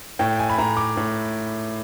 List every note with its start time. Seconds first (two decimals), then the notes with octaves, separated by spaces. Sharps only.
0.19 A2 G5
0.39 G#5
0.49 B5
0.58 A2 A#5
0.77 D6
0.97 A2